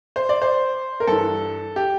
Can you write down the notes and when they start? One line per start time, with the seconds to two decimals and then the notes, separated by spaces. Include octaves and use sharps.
0.16 C5
0.29 D5
0.42 C5
1.00 A#4
1.07 G2 E3 A4
1.76 G4